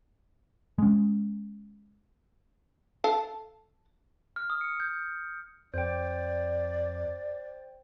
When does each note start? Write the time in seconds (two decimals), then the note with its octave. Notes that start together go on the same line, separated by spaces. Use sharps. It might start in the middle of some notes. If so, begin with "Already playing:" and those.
0.78 G#3 C#4
3.04 A4 F5 A5
4.36 F6
4.50 D#6
4.61 C#7
4.80 G6
5.74 F2 C5 D5 G5